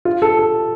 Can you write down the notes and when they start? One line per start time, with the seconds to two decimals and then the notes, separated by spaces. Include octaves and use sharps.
0.05 F4
0.22 A4
0.39 A4